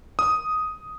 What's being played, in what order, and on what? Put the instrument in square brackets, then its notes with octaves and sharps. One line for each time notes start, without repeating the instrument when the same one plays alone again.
[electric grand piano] D#6